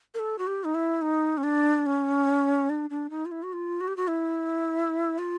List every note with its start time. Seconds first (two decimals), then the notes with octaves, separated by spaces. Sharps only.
0.14 A#4
0.19 A4
0.39 F#4
0.47 G4
0.64 D#4
0.75 E4
1.02 D#4
1.37 C#4
1.43 D4
1.86 C#4
2.70 D4
2.90 D4
3.10 D#4
3.26 F4
3.32 E4
3.43 F#4
3.53 F4
3.81 F#4
3.88 G4
3.97 F#4
4.08 E4
5.18 F4